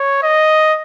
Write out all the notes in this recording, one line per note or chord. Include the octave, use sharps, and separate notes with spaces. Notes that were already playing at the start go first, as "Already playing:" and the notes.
Already playing: C#5
D#5